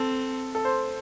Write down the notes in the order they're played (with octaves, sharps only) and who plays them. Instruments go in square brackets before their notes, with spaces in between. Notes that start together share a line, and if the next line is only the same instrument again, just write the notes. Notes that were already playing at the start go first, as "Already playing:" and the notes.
Already playing: [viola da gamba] C4 [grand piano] A4
[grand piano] A4
C5